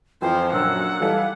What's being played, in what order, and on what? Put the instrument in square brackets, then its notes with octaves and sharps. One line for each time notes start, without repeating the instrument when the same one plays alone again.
[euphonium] F2 [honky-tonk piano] E3 [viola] F3 C5 [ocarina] G5
[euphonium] F#2 [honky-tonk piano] A#2 D3 F#3 [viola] F#5 [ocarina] E6
[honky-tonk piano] E3 G3 D#4 [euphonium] A4 [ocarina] F5